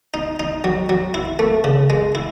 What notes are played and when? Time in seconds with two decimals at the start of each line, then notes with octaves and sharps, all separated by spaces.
0.14 D#4
0.40 D#4
0.64 F#3
0.89 F#3
1.14 E4
1.39 A3
1.64 C#3
1.90 G#3
2.15 E4